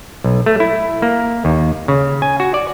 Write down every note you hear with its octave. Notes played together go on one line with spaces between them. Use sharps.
B1
A3
E4
A#3
D#2
C#3
G#5
F#4
D5